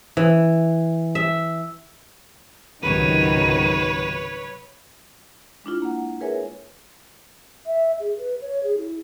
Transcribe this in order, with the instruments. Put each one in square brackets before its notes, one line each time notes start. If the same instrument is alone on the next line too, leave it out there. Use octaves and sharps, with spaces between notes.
[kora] E3
E5
[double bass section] C#2 G#2 C3 [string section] D#3 F#3 [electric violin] B4 C#5 [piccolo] D#7
[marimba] G#3 D4 E4 F4
A#3 F#5
G#4 A#4 B4 C#5 E5 G#5
[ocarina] E5
G#4
B4
C#5
G#4
E4